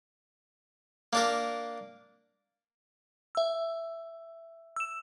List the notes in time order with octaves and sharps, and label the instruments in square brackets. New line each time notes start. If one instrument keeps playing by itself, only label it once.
[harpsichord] A#3 D4 A#4
[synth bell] E5 E6
E6 E7